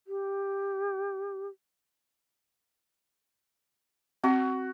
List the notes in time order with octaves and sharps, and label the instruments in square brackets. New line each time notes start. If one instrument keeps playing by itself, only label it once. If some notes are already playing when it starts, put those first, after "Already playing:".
[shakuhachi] G4
[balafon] C4 [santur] F#4